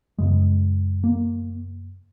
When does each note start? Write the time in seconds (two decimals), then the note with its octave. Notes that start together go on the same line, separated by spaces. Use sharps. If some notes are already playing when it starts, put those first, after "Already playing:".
0.18 F#2 C#3 G#3
1.04 A#3